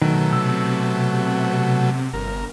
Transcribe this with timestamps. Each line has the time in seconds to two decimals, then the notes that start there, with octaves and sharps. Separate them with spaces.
0.02 B2 D#3 F#3 A3
0.33 C3 E6
2.13 G1 A#4